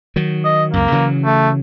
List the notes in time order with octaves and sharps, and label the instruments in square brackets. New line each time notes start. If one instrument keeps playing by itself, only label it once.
[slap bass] D#3 F#3
[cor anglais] D#5
[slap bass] C#2 F#2 [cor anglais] A#3
[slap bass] C#3 E3 F#3
[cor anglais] A3